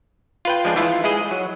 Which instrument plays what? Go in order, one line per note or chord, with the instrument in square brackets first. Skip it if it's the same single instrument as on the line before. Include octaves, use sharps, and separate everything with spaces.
[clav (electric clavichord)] F4 B4 G5
F3 G#3 D4
E3 E4 F4
G#3 E4 G#4 D#5
F#3